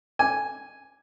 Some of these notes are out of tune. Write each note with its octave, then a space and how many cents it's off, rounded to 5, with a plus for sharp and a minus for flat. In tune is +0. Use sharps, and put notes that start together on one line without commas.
G#5 +0 D6 +0